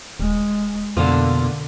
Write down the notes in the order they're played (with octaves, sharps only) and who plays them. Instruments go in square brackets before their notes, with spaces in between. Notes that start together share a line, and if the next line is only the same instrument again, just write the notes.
[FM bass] D#1 [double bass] G#3
[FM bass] F2 [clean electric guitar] B2 A#3 F4 [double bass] D3